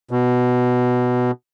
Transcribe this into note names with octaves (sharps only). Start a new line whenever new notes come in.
B2